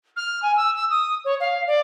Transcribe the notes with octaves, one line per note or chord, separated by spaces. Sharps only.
F6
G#5
E6
E6
D#6
C#5
F5
D5